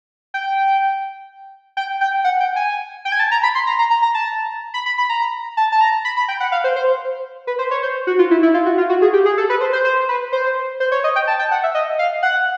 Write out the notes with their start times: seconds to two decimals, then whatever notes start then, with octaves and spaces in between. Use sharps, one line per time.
0.34 G5
1.77 G5
2.01 G5
2.24 F#5
2.40 G5
2.56 G#5
3.05 G5
3.12 G#5
3.20 A5
3.31 A#5
3.43 B5
3.55 C6
3.67 A#5
3.79 A#5
3.91 A#5
4.03 A#5
4.14 A5
4.74 B5
4.86 B5
4.98 B5
5.09 A#5
5.57 A5
5.72 A5
5.81 A#5
6.05 B5
6.17 B5
6.28 G5
6.40 F#5
6.52 F5
6.64 C5
6.76 C5
7.47 B4
7.59 C5
7.71 C#5
7.83 C5
8.07 F#4
8.19 F4
8.31 E4
8.43 E4
8.54 F4
8.66 F#4
8.78 F4
8.89 F#4
9.02 G#4
9.13 G4
9.26 G#4
9.38 A4
9.50 B4
9.61 C5
9.73 C5
9.85 C5
10.09 B4
10.33 C5
10.80 C5
10.92 C#5
11.04 D#5
11.16 G5
11.27 A5
11.39 G5
11.51 F#5
11.63 E5
11.75 D#5
11.99 F5
12.23 F#5